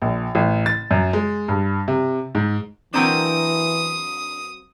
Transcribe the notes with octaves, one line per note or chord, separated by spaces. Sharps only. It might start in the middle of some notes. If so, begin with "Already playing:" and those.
A#1
A1
A6
F#2
G#3
G2
C3
G#2
E3 F#3 A#3 C4 D4 A#4 G5 D#6